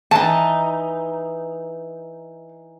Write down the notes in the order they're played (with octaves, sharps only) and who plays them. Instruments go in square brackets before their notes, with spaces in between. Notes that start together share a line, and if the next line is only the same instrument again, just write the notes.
[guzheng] E3 D#4 [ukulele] A5